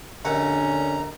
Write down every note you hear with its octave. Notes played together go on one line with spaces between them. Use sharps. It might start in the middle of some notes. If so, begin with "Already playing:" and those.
A#1 D#2 D3 C#4 F#5 A#5